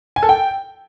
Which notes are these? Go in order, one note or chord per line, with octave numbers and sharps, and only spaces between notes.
G#5
A4
G5